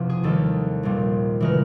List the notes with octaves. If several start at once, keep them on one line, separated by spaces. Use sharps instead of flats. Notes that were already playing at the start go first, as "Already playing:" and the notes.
Already playing: F#1 E2 C3 F3
G#4
D#2 D#3 G3 A4
A#1 A#2 G3
C#3 E3 G#3 A#4